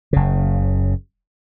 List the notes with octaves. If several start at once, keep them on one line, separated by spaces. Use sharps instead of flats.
F#1 C#3